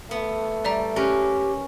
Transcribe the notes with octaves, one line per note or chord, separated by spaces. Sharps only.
A3 B3
G3 D5 E5 A#5
C#4 G4 A#4 B4